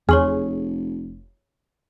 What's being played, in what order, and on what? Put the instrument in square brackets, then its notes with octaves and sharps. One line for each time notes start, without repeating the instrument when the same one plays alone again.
[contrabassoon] F1 [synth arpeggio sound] E2 C6 [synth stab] G#4 [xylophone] C#5 C#6 F6